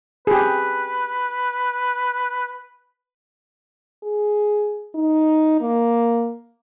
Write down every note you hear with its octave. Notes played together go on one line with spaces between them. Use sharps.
G4 G#4 B4
G#4
D#4
A#3